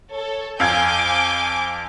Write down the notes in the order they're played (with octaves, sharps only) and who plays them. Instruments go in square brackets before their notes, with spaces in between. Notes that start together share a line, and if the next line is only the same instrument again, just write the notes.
[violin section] A4 C#5
[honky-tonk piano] F2 F5 G#6 [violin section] G#5 D6 G6